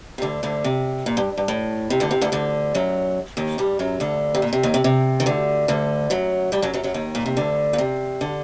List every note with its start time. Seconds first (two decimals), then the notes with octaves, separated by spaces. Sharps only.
0.18 C3
0.22 D2 D3
0.43 D2 D3
0.64 C3
1.06 A#2
1.17 G2
1.38 G2
1.48 A2
1.90 C3
2.00 D2 D3
2.11 C3
2.21 D2 D3
2.32 D2 D3
2.75 F#2 F#3
3.37 D#2 D#3
3.58 G2 G3
3.79 F#2 F#3
4.00 D2 D3
4.35 C3
4.42 A#2
4.53 C3
4.63 D#2 D#3
4.74 C3
4.84 C3
5.20 D#3
5.26 D2 D3
5.68 D2 D3
6.10 F#2 F#3
6.52 G2 G3
6.62 F#2 F#3
6.73 F#2 F#3
6.84 F#2 F#3
6.94 D#2 D#3
7.15 A#2
7.26 C3
7.37 D2 D3
7.73 A#2
7.78 C3
8.21 D3